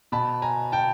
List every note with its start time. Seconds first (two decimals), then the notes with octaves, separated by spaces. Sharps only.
0.12 B2 A5 B5
0.42 G#5 A#5
0.72 G5 A5